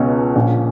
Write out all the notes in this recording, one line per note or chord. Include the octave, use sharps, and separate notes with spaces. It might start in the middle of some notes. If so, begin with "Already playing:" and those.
Already playing: C#2 B2 C#4
A#1 A#2